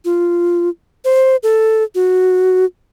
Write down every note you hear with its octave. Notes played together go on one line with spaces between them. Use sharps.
F4
C5
A4
F#4